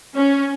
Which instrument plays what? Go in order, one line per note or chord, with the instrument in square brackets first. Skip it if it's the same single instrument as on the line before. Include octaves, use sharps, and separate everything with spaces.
[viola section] C#4